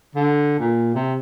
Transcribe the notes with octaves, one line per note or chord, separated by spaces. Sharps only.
D3
A#2
C3